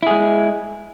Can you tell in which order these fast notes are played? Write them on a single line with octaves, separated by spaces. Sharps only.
E4 G#4 G#3